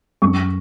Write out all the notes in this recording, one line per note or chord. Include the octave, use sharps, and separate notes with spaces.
F#2 C#6